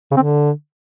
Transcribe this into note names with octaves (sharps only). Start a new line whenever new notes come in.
C#3
C4
D3